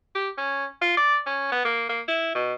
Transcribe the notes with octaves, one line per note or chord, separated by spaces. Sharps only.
G4
C#4
F4
D5
C#4
B3
A#3
A#3
E4
B2